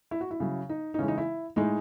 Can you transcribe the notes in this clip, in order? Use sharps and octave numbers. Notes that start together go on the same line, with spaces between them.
E4
F#4
E4
C#3 F#3
D#4
D#4
C#3 E3 G#3 C#4
D#4
E4
A2 G#3 D#4